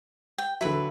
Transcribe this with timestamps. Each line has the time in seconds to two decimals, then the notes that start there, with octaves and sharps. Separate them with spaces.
0.38 G5
0.61 D3 F#3 E4 B4 B5